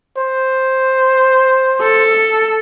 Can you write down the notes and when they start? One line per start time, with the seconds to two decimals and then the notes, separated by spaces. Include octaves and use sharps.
0.17 C5
1.82 A4